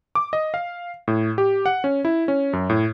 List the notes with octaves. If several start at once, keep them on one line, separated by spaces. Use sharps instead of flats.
D6
D#5
F5
A2
G4
F#5
C#4
E4
C#4
F#2
A2